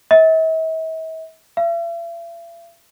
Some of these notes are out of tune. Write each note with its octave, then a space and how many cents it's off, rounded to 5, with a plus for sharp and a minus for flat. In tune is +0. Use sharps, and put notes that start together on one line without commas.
E5 -45
E5 +45